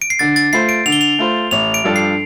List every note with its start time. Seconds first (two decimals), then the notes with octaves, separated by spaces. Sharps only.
0.02 D7
0.10 C7
0.19 D3 A6
0.36 A6
0.53 A3 F4 C5 C7
0.69 D7
0.86 D3 F7
0.92 G7
1.01 F7
1.19 A3 F4 C5
1.51 A1 F7
1.74 D7
1.84 G2 F3 D4 A4
1.96 C7